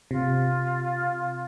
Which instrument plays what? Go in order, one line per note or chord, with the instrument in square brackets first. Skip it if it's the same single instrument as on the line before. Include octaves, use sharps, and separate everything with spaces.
[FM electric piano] C3 [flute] F4